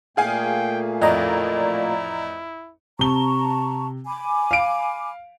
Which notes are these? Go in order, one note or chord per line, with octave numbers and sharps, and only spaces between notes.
A#2 A3 A#3 G#4 F5 G5 G#5
A1 F2 E4 D5 D#5 A#5
C3 A5 A#5 C#6 G7
G#5 B5 D6
F5 D7